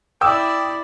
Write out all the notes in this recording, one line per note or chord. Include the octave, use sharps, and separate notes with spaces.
E4 D5 G5 D#6 E6